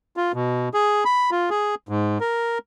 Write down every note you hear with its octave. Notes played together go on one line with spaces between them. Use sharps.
F4
B2
G#4
B5
F4
G#4
G#2
A#4